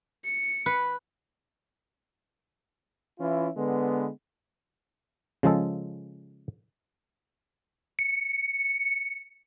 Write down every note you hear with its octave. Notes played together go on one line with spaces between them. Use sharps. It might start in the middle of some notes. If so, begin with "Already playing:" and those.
C#7
B4
E3 C#4 E4 F4
D3 G#3 B3
C#3 F3 G#3 A4
C#7